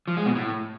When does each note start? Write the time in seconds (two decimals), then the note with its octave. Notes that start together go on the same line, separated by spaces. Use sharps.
0.08 F3
0.17 G#3
0.26 B2
0.35 A2